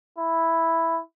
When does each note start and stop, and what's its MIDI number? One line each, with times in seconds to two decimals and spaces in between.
0.18 1.00 64